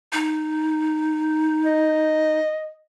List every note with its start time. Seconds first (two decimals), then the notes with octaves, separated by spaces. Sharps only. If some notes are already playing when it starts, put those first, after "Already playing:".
0.13 D#4
1.66 D#5